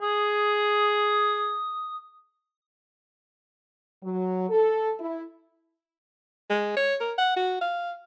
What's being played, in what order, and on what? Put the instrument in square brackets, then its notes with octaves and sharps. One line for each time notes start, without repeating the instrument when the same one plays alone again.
[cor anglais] G#4 [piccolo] D#6
[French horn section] F#3
A4
E4
[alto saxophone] G#3
C#5
A#4
F#5
F#4
F5